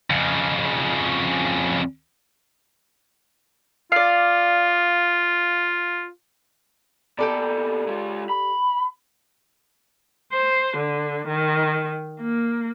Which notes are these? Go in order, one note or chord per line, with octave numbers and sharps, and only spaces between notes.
F2 C#3
F4 D5 F5
A#2 B3 G4 A4 D5
G#3 F4
B5
C5
D3
D#3
A#3